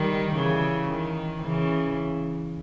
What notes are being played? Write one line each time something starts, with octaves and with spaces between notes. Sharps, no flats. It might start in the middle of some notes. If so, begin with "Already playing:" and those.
Already playing: D#3 G3
C#3 E3
D#3
C#3 E3